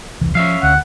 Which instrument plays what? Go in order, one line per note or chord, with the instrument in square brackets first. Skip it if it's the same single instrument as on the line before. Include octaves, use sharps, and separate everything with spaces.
[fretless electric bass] E1 C2 E3
[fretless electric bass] F3 [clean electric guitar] C#4 E5 F5
[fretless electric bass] D2 [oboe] F#5